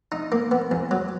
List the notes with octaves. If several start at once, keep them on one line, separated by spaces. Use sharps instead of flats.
D#4
A#3
B3
E2
F#3